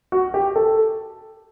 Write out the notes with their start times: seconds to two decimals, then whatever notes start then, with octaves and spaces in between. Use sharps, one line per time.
0.12 F#4
0.34 G4
0.56 A4